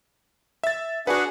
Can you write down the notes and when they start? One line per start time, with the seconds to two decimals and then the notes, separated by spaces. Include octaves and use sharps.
0.64 E5 A6
1.07 D4 F#4 G#4 B4 F#5